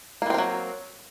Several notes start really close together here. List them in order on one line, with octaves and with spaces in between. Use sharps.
A#3 E3 C4 A#4 F#3